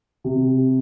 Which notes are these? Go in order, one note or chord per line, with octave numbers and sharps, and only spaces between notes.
C3